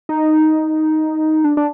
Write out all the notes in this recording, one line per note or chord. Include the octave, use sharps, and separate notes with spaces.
D#4
D4
D4